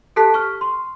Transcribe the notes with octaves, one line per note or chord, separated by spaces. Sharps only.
G4 A4 A5 F#6 B6
C#6 F6
C6